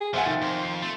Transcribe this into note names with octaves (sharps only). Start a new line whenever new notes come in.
G#4
F3 A3 C5 E5 F#5 G#5
D#3 A6
F2 C5
C7
A3 C6